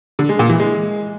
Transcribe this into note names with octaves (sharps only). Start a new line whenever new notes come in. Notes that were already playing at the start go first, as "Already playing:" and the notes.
D3
G#3
A#2
E3
G#3